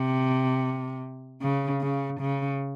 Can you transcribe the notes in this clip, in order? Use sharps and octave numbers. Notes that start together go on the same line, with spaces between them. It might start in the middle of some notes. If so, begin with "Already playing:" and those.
Already playing: C3
C#3
C#3
C#3